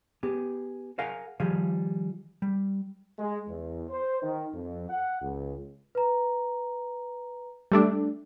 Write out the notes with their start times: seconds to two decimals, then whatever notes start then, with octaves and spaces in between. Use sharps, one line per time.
0.23 B3 G4 G#4
0.98 G#4 A#4 F5 F#5 G#5
1.40 D#3 F3 G3 G#4 F5
2.42 G3
3.19 G#3
3.48 E2
3.89 C5
4.22 D#3
4.54 F2
4.89 F#5
5.21 C#2
5.95 B4 A#5
7.72 G3 A3 D4